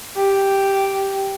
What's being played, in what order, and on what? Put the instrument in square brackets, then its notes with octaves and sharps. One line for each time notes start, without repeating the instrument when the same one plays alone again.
[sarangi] G4